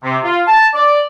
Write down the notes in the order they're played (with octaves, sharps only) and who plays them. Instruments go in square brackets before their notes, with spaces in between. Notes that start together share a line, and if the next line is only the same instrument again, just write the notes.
[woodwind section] C3
F4
A5
D5